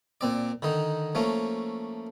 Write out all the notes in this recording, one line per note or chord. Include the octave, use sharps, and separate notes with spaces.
A#2 C4 D5
D3 D#3 D#4
F3 A3 A#3 C#4